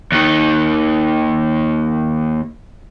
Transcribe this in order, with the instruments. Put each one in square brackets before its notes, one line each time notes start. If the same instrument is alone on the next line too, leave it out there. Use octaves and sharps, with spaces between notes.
[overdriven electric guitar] D#2 D#3